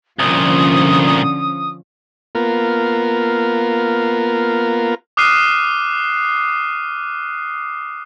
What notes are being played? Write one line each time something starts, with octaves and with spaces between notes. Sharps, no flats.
C2 A#2 D3 F3 C#4 D#6
A#3 B3 F4 A#4
D6 D#6 F6 F#6 C7 D#7